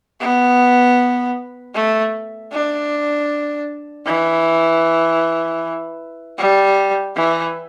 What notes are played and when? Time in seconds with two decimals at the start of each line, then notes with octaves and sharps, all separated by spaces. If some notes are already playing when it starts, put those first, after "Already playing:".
0.21 B3
1.75 A3
2.52 D4
4.07 E3
6.38 G3
7.16 E3